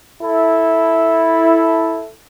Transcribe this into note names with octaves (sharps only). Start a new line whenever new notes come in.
E4 A4